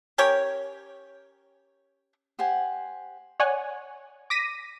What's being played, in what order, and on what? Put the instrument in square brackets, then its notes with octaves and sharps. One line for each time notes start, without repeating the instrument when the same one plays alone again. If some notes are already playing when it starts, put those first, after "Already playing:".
[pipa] C#4 G4 A#4 C#5
[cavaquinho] G4 C5 F#5 G#5
[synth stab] C#5 D5 F#5 G#5
D6 A#6 B6 D#7